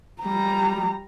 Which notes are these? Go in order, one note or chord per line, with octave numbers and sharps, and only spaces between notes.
G3 A#5